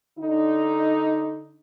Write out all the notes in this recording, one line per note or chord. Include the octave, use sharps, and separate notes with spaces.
D3 D#4